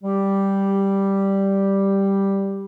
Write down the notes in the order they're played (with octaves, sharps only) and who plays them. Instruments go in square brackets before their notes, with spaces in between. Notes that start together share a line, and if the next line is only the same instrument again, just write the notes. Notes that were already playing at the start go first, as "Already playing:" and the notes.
[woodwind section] G3 G4